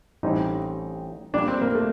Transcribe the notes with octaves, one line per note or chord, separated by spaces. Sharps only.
A1 A2 G3 C4 D#4
A#1 A#2 G3 D4
C4
A#3
A3